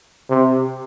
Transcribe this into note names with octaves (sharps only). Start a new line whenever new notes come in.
C3